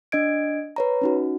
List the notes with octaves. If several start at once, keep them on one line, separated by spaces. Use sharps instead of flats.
D4 D#5 G#6 D7
B4 C#5 A#5
C#4 D#4 F#4